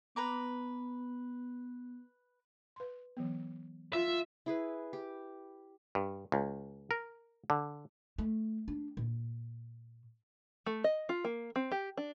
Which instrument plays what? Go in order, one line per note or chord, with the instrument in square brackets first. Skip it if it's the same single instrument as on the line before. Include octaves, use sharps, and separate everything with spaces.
[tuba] B3 [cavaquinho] B4 A#5 D6
[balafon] B4 C6
E3 F#3 B3
[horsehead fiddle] F4 [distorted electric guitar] E5
[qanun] E4 G#4 B4
G4
[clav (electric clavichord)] G2
C#2
A#4
D3
[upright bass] A3
D4
A#2
[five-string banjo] A3
D#5
F4
A#3
C4
G4
D4